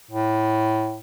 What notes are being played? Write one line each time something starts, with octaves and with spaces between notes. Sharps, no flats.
A2